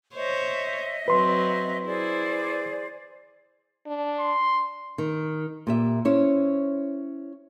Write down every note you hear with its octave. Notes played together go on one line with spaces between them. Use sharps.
C5 C#5 D#5 E5
F#3 C4 B4 C6
E4 G#4 C5 D5
D4
C6
D#3
A#2 G4 E5
C#4 E4 C5 C#5